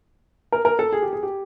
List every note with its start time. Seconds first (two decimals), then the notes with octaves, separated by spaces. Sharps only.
0.52 A#4
0.65 A#4
0.79 A4
0.92 G#4
1.02 G4
1.13 G#4
1.23 G4